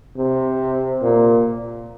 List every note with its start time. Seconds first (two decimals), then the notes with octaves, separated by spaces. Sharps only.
0.16 C3
1.01 A#2